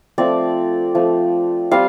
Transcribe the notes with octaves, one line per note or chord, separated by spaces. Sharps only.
F3 A3 C4 D5
F3 A3 C4
G3 C4 F4 F5